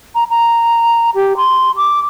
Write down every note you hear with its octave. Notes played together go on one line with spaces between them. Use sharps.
A#5
A#5
G4
C6
D6